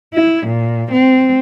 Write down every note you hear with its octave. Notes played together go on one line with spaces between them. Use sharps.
E4
A#2
C4